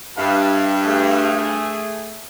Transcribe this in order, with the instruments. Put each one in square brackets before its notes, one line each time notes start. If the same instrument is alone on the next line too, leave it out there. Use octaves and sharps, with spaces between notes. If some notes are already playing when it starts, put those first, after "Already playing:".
[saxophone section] G2 [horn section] E5 F5
[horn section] A3 G#4